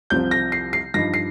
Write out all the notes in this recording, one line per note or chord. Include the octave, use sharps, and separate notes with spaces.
C2 C3 F3 C4 G6
A#6
C7
C7
G2 F3 D#4 A#6
C7